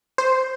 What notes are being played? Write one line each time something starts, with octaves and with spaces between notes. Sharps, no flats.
C5